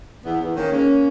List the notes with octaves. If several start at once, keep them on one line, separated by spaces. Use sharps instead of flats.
E2 B3
E2 B3
D#3 A#3 C#4
G#3 A#3 C#4